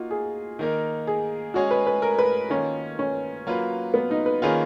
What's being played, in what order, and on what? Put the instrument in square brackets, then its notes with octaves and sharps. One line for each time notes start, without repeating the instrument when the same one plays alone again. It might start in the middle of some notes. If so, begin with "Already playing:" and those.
Already playing: [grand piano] A#3 D#4 F#4 [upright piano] F4
[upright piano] G#4
[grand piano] D#3 A#3 D#4 A#4
[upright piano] G#4
[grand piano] G#3 C#4 G#4 C#5 [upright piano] F#4
[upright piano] B4
B4
A#4
B4
[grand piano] D#3 A#3 F4 [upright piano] C#4
[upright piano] C#4
[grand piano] F#3 A#3 F4 B4
[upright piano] B3
D#4
B4
[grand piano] D#3 A#3 C#4 F4 B4 [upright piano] G#4